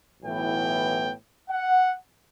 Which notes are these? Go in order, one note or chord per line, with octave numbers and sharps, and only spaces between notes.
B1 A2 E3 B3 G5
F#5